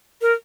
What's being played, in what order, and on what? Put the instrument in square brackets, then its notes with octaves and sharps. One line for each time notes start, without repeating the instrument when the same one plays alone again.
[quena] A#4